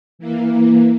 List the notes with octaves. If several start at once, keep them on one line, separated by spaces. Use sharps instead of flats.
E3 A#3